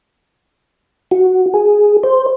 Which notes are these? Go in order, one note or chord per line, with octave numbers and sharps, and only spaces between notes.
F#4
G#4
C5